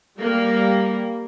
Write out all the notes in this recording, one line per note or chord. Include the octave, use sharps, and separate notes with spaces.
G3 A#3